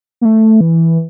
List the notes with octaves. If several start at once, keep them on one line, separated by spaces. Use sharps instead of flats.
A#3
A3
E3